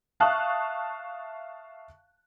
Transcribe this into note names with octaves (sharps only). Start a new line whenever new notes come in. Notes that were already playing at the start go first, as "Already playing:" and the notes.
E5 F5 A5 C#6 D#6 F#6